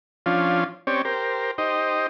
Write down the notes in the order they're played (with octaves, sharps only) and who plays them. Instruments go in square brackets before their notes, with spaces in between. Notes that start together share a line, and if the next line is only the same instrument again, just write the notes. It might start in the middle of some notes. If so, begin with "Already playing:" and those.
[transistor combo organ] F3 C#4 D4 F4
C4 C#4 G4 C#5 D5
G4 A#4 C5
D#4 G4 C5 D#5